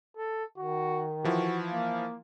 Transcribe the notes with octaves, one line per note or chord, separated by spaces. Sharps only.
A4
D#3 F#4
E3 F3 E4 F#4
A#3 F5